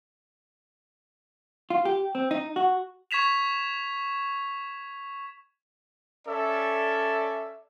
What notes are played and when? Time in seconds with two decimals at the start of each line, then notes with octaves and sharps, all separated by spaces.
1.70 F4
1.85 G4
2.15 C4
2.31 D#4
2.56 F#4
3.11 C#6 G#6 B6 E7 F7
6.28 C#4 A4 D5 E5